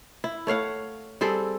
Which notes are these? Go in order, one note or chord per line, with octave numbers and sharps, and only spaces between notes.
E4
A3 C#5 F5 F#5
G3 C4 G#4 A4